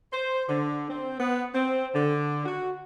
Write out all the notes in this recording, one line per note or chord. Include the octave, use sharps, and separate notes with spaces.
C5
D3
C4
B3
C4
D3
F#4